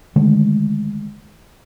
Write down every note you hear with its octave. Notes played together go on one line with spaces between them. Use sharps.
D3 D#3 G#3 A3